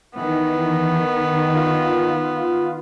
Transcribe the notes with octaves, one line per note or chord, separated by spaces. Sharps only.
D#3 E3 B3
F4